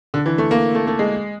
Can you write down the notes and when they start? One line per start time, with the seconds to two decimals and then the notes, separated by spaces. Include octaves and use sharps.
0.14 D3
0.26 E3
0.38 A3
0.51 A#3
0.75 A3
0.87 A3
0.99 G#3